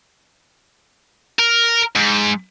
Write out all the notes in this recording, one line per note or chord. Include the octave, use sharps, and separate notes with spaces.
A#4
G#2